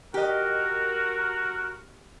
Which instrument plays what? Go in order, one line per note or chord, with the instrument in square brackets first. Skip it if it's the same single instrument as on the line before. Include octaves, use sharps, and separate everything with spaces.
[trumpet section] F#4 A#4 [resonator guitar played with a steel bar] G4 D#5